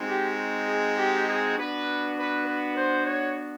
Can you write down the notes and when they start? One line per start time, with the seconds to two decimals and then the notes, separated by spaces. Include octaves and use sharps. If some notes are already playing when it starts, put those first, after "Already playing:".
Already playing: G#3 C4 D#4 F#4
0.08 G4
0.68 G#4
0.98 G4
1.28 G#4
1.57 B3 D4 F#4 B4
2.17 B4
2.46 B4
2.76 C5
3.06 C#5